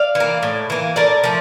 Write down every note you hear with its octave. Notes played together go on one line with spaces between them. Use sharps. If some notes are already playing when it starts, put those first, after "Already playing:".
Already playing: D5 F5
E3
A#3
A2
E3 A#3
A2 A#4 D5
F3 A3